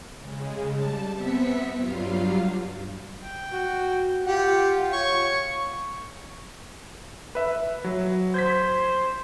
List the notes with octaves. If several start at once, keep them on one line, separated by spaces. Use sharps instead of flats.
C#3 G#3
G3 A5
B3 C4 E5 B6 C#7
G2 F#3 G3 F4 F5
G5
F#4
F4 G4 F#5
C#5 C#6
B4 E5
F#3
C5 G6 G#6 B6